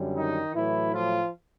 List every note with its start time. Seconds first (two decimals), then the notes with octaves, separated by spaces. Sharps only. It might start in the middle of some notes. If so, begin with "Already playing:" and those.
Already playing: F#2 D3 G3
0.15 D#3 D#4
0.54 A2 E3 F#3 E4
0.93 F3 F4